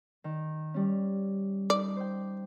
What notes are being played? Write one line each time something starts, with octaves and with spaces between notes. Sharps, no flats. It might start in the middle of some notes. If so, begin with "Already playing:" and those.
D#3
G3 C#4
D#4 D5 D6
C5 G5